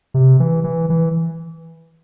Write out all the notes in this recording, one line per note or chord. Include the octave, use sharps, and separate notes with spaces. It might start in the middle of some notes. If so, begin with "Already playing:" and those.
C3
E3
E3
E3